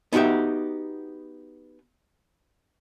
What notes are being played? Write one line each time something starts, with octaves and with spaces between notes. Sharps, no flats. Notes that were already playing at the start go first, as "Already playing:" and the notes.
B3 D#4 F#4 G4 E5